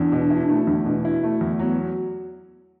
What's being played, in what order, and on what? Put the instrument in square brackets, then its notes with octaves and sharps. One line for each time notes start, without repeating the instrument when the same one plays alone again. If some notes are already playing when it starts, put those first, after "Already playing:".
Already playing: [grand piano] E2 [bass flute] D4
[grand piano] B2
E4
A3
E2
B2
E4
A3
E2
[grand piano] F#3 [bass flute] B3